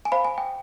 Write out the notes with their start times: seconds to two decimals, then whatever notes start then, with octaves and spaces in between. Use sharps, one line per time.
0.05 G#5
0.12 C5 F5 B5
0.25 G#5
0.38 G5